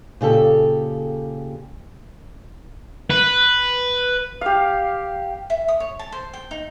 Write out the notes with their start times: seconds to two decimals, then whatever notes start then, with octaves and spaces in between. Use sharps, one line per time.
0.21 A#2 C#3 G4 A4
3.10 B4
4.41 G4 F5
5.50 E5
5.68 D#6
5.80 C#5
5.99 A5
6.12 C5
6.33 G5
6.51 D#4